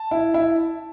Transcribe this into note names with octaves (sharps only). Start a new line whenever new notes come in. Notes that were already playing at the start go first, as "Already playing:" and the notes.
Already playing: A5
E4
E4